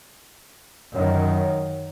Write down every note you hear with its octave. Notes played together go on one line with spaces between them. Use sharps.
F#2 D#3